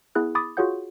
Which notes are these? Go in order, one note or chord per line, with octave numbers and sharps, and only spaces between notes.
B3 E4 G#4 F#6
B5 D6 D#6 A6
F4 F#4 G#4 C#5 F#5 G6